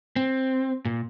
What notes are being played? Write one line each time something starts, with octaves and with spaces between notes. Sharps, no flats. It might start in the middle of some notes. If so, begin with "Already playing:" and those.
C4
A#2